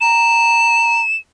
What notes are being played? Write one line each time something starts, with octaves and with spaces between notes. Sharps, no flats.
A#5 E7